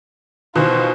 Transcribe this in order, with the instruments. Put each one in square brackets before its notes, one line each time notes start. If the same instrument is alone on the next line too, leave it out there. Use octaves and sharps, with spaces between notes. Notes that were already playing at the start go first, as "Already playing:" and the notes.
[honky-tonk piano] B2 D#3 E3 [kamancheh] F4 C5